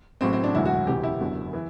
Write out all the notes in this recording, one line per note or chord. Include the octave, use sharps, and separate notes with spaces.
A1 A2 F#3 C4
C4
D4
E1 D2 D3 F#3 E4
F#4
E1 D2 C3 E3 G4
E4
F#1 E2 D3 F#3
E3